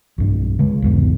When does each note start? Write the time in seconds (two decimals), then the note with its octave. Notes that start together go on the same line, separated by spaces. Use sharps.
0.18 B1 G2
0.59 C#3 G#3
0.82 B1 E2 G#2